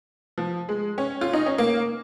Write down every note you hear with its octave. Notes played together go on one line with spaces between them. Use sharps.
F3
G#3
C#4
F4
D#4
C#4
A#3